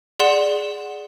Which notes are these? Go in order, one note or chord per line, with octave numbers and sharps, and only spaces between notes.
G#4 D5 F#5 C6 E7